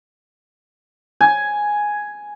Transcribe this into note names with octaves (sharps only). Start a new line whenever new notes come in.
G#5